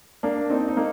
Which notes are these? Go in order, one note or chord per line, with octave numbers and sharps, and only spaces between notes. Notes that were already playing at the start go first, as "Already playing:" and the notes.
A#3 D4
C4 D#4
D#4
A#3